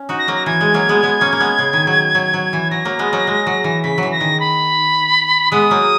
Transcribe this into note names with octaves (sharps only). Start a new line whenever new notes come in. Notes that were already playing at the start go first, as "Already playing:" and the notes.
Already playing: C#4
D#4 F#4
A#6
F#3 A#3
A#6
E3 G#6
G#3
F#3 A#3
G#3 B3
G#3 B3
A#3 C#4
A#3
G#3 B3
C#3
D#3
F#3
F#3
F#3
E3
F#3 A#6
F#3 A#3
G#3 B3
F#3 A#3
G#3
F#3
E3
C#3 B6
E3 F#3
A#6
D#3
B5
G#3 B3 D#6
F#3 A#3